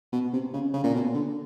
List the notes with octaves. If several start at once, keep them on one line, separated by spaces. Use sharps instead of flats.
B2
C3
C#3
C#3
A#2
B2
D3